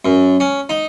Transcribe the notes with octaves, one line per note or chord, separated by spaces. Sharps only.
F#2
C#4
D#4